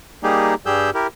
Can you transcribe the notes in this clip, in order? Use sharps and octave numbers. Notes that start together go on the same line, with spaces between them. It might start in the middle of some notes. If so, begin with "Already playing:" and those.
G3 A#3 D#4 G4 G#4
G2 G3 G4 G#4 E6 G6
E4 G4 A#4